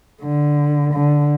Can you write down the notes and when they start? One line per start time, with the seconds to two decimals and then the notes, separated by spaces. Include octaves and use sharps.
0.22 D3
0.94 D3